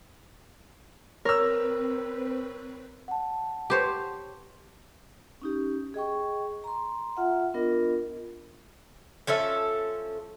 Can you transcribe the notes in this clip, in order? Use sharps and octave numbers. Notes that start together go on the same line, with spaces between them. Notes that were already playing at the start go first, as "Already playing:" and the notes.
C4 A#4 B4 C#5 E6
F#5 A5
G4 C5 C#5
C#4 D#4 G4
G#4 D#5 G5 C#6
A#5 C6
F4 E5 F#5
B3 D4 F4 A#4 D#5
F3 C#4 A4 E5